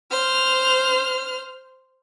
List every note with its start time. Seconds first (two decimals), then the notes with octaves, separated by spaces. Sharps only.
0.11 C5 F6